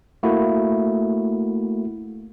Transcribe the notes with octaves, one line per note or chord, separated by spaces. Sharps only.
A3 A#3 E4 F#4